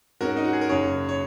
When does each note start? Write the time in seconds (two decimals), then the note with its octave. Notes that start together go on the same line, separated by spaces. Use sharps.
0.21 G#2 G#3 C#4 F#4 A#4
0.37 D#4
0.44 F#4
0.53 G#4
0.61 A#4
0.69 F#1 F#2 C#3 F#3 G#4 C#5
1.09 C#5